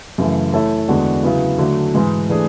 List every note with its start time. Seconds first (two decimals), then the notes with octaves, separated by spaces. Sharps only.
0.18 F#2 C#3 E3 A3 E4
0.54 A3 E4 A4 C#5 E5
0.88 E2 D3 G#3 D4 F#4
1.23 C#3 F#3 B3 E4
1.58 D3 F#3 A3
1.94 G#2 E3 G#3
2.29 E3 A3 D4 G#4